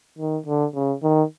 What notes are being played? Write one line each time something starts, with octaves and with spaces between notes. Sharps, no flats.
D#3
D3
C#3
D#3